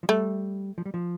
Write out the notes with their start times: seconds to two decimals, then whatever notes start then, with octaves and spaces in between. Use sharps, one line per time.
0.03 F3
0.09 G3 A3
0.78 F3
0.86 G3
0.94 F3